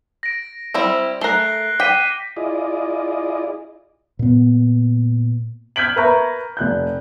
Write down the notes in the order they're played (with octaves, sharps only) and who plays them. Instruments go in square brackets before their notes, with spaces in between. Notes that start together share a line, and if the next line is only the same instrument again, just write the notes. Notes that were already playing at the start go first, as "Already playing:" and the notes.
[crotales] A#6 D7
[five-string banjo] G3 C4 E4
[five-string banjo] A3 A#4 [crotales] F#6 C7 G7
[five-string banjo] G5 [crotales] D6 B6 D#7
[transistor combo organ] E4 F4 G#4 D5 D#5
[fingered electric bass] A#2 B3
[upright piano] F6 G6 G#6 B6 D7 F#7
A#4 B4 E5 A#5 C#6 G6
F1 F#6 G6